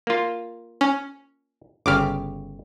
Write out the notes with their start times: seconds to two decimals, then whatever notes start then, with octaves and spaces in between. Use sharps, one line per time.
0.07 A#3 F4
0.81 C#4
1.86 G1 C#3 G4 D6 F6